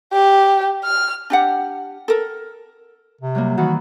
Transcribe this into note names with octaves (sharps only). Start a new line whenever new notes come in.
G4
F6
D4 G4 F#5
A4 A#4
C3
F#3 G3 A#3
D#3 E3 F#4